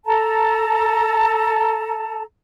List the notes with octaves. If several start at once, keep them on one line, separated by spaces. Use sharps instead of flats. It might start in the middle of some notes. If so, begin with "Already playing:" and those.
A4 A5 A#5